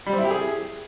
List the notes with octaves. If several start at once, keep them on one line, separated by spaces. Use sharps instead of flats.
G3
C4
E4
G4
G#4